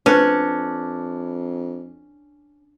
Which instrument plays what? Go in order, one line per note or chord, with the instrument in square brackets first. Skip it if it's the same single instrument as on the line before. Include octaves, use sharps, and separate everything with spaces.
[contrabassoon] F2 [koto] C#4 [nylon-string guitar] D4 [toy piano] B4 C5